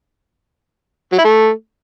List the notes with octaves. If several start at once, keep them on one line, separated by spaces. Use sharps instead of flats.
F#3
E4
A3